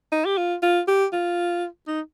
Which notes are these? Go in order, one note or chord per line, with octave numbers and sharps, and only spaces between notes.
D#4
G4
F4
F4
G4
F4
D#4